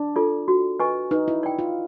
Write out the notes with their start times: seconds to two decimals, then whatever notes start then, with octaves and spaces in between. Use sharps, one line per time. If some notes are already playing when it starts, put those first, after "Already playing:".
Already playing: D4
0.16 F4 A4 D5
0.48 F#4
0.80 B4 D#5 G#5 C#6
1.11 D#4 B4
1.28 E4
1.43 D5 G5
1.59 F4